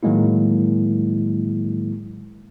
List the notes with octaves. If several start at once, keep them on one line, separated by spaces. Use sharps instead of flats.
A2 D#3 F#3 G#3 A#3 E4